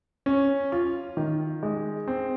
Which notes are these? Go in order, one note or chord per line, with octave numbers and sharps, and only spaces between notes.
C#4
F4
D#3
G#3
C4